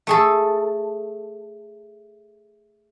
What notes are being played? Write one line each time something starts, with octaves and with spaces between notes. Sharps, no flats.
A3 G#4 A4